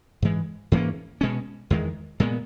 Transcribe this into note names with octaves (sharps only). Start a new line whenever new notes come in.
G#2 E3 G#3
G#2 E3 A#3 C#4
B2 G#3 C#4
E2 D#3 G#3
A#2 G#3 B3